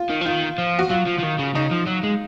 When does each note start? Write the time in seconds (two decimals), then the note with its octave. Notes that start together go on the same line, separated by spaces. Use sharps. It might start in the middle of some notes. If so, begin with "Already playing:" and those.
Already playing: F4
0.10 D#3
0.21 F3
0.25 D#3 F4
0.58 F3
0.79 F#4
0.90 F#3 F4
1.06 F3
1.18 F3
1.22 D#3
1.39 C#3
1.55 C#3 D#4
1.71 F3
1.86 F#3
2.03 G#3